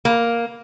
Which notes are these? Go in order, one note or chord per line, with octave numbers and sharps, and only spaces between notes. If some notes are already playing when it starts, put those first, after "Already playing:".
A#3